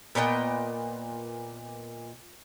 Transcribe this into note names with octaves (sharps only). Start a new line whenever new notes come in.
A#2 B3 D#5 G5